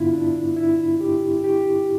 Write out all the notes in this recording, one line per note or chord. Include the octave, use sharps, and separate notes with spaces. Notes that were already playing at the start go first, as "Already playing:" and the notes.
Already playing: G2 D3 B3 D4 E4 F4
D4
E4
G4
G4